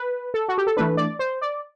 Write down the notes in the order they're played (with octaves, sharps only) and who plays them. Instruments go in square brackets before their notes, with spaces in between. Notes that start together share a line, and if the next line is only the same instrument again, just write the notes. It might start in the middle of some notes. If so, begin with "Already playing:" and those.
Already playing: [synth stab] B4
A4
F#4
G4
A4
E3 A3 D4 B4
D5
C5
D5